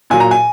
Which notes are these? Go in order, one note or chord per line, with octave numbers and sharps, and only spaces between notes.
A#2 F#3 G#5
A#5
G#5